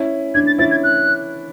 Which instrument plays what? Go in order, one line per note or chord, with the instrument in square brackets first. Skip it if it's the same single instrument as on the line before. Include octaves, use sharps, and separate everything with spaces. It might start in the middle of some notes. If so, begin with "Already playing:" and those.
Already playing: [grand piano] C#4 E4
[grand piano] D4 [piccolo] G#6
[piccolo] A6
[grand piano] C#4 E4 [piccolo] A6
[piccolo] G#6
F#6